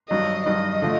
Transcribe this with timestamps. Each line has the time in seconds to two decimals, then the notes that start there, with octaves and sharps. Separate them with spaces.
0.10 G2 D#3 F#3 D#5
0.46 G2 D#3 F#3 D#5
0.82 D3 F3 A3